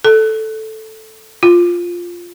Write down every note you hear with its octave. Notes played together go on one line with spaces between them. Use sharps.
A4
F4